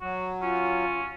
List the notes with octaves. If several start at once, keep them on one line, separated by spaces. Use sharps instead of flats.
F#3 F#4
C#4 F4